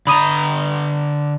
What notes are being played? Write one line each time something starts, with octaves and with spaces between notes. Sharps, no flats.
D3 A#5 B5 D#6 D#7